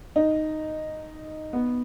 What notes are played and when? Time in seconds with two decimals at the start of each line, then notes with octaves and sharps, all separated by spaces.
0.16 D#4
1.53 B3